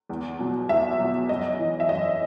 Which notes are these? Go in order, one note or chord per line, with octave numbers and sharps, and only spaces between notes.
E2
B2 F#3
E2 E5
B2 F#3
F#2 D#5
E3
E5
F#2 D#5